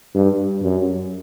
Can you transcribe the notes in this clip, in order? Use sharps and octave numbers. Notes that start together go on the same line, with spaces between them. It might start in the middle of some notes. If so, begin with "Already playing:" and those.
G2
F#2